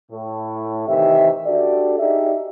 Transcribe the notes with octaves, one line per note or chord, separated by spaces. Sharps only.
A2
C3 D#3 E3 G4 E5
D4 F#4 G4 A4 D5
D#4 G4 G#4 D5 E5